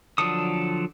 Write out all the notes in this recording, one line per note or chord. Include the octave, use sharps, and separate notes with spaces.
D3 F3 F#3 A4 D#6